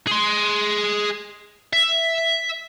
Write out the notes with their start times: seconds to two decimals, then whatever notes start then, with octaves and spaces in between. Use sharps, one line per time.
0.07 G#4 C6
1.73 E5